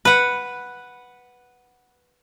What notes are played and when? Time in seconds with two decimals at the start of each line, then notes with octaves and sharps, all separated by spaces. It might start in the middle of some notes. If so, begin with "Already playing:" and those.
0.05 B4 F#5